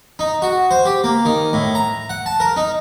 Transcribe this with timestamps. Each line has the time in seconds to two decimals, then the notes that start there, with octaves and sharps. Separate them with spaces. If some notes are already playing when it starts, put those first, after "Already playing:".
0.19 D#4
0.42 F#4
0.71 C5
0.86 G4
1.04 A#3
1.25 D#3
1.53 A2
1.75 A#5
2.10 F#5
2.26 A5
2.40 A#4
2.56 D#4